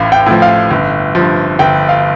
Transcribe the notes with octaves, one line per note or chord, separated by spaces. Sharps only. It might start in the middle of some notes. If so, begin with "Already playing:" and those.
Already playing: A1 A2 F5
G5
A2 F3
F5
G1
G2 F3
G1 G5
F5